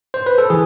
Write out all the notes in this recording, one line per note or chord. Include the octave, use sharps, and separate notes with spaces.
C5
B4
A4
E3 G#4